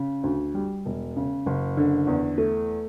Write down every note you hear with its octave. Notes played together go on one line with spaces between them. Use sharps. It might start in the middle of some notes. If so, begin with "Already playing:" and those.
Already playing: C#3
D2
G3
E1
C#3
F#1
D3
E2
A3